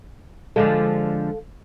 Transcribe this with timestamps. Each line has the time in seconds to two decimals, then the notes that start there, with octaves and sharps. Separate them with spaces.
0.56 D3 F3 G#3 A4 F5